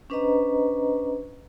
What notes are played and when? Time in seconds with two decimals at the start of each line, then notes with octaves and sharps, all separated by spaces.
0.10 C#4 D4 B4 C5 D#5 A#5